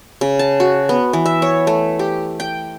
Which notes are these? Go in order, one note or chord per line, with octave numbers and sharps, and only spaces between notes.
C#3
A5
F#4
B3
E3
E5
C#5
A3
G4
G5